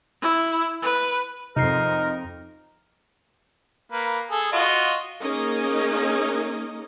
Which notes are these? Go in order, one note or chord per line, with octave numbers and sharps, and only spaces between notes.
E4
B4
F2 C3 C4 D#4 A#4 C7
A#3 B4
G#4 A4
F4 F#4 D#5
A#3 C#4 D#4 G#4 A#4 D#5